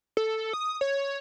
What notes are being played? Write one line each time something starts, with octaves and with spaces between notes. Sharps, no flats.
A4
D#6
C#5